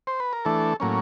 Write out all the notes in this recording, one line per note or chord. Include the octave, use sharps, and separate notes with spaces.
C5
B4
A#4
E3 A3 D4 A4
A2 F#3 A#3 C#4